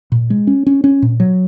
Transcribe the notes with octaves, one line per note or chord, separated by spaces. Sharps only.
A#2
G#3
C#4
C#4
C#4
A#2
F#3